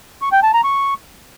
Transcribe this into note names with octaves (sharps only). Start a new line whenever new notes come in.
C#6
G5
A5
A#5
C#6